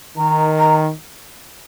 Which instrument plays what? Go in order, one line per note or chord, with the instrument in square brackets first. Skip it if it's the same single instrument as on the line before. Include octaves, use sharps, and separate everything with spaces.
[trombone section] D#3 [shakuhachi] A#5
[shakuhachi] A#5